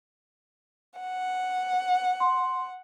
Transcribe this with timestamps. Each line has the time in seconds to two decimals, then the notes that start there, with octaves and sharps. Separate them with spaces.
0.99 F#5
2.20 C6